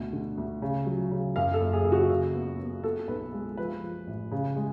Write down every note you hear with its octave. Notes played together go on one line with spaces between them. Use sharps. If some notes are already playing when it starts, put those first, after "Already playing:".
Already playing: D2 B2
D3
D2
C#3
F#3
C#3
F#2 F5
A4
F#1
G#4
C#3
F#4
C#3
B3
B3
B3 A4
B1 B4
G#3
F3 B4
F3
A1
C#3
G#3